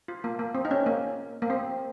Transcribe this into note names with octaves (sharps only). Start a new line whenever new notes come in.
F4
A#3
A#3
C4
D#4
C#4
A#3
A#3
C4